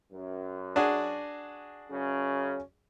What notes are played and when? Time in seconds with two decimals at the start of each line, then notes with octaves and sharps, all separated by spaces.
0.13 F#2
0.76 D4 F#4 G#4
1.90 F#2 C#3 C#4